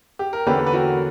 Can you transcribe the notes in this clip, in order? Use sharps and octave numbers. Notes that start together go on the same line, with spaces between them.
G4
A#4
E2 D3 A#3 C#4 G4 B4
B4
F#4 A#4